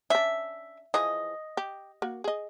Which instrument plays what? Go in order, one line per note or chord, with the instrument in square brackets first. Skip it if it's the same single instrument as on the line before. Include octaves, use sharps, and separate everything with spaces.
[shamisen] C#4 D4 [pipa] E5
[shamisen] E3 F3 G#4 [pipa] D#5
[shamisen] G4
A#3 F#4
G#4 D#5